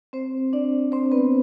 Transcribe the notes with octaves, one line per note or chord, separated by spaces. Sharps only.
C4 C5
D4 D5
C4 C5
B3 B4